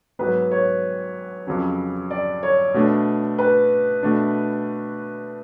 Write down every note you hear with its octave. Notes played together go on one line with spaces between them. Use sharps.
G#2 F#3 B3 B4
C#5
F2 C#3 F#3 C#4
D5
C#5
B2 A3 D4
B4
B2 A3 D4